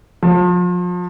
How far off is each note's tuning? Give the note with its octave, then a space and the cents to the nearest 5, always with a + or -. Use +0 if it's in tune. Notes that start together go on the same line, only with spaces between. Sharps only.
F3 +35